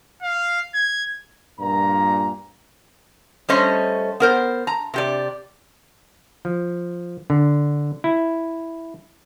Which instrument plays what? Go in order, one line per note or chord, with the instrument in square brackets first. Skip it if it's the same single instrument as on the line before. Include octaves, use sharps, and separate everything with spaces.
[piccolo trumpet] F5
G#6
[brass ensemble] G2 A#2 A#5
[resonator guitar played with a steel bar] G3 A3 C#4 C5 D#5
B3 A#4 C5
A#5
C3 G4 D5
[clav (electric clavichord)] F3
D3
E4